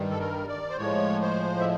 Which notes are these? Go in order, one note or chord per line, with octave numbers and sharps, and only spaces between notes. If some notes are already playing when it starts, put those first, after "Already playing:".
Already playing: G2 D#3 G3
A4
A#4
D5
C5
A2 F3 G#3 C#5
C5
E5